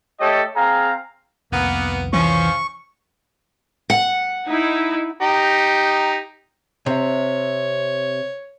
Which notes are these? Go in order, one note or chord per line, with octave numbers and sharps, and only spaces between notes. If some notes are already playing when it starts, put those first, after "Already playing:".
A3 G4 A4 C#5 D#5
C4 G#4 F5 A#5
C2 F2 D#3 A#3 B3
E3 F3 C#4 C#6
F#5
D#4 E4
D#4 G4 A#5
C3 C5 C#5 E5